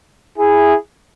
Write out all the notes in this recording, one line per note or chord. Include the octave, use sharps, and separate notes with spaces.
E4 G#4